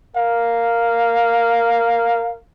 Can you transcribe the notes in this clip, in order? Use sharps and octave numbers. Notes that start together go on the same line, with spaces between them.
A#4 F5